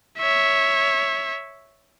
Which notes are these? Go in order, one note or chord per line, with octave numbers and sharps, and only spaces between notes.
C#5 E5